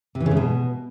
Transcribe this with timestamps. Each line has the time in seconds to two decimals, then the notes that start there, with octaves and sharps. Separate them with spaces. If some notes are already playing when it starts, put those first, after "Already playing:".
0.15 C3
0.20 E3
0.26 C#3
0.31 G#2
0.37 B2